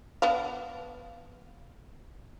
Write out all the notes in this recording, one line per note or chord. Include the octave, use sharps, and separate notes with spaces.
B3 D4 F5